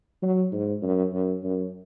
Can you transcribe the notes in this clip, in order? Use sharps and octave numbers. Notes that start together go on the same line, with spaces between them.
F#3
G#2
F#2
F#2
F#2